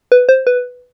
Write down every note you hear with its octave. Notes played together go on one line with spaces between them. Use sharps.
B4
C5
B4